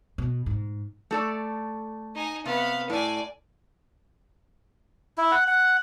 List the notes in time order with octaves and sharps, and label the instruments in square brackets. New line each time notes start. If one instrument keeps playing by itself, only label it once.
[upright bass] B2
G#2
[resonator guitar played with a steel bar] A3 A4 D5
[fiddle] D#4 G#5
[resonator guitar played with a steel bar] C3 [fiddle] B3 F5
[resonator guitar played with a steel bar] A2 [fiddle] D5 G#5
[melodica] E4
F#5
F#5